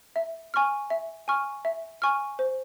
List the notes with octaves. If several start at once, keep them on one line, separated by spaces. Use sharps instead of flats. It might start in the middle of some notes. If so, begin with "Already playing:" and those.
E5
G#5 C#6 F6
E5
G#5 C#6 F6
E5
G#5 C#6 F6
C5